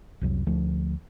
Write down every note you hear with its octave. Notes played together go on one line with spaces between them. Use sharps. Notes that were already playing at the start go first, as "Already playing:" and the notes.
C2 F2 C3 F#3
D2 D3 F3 A3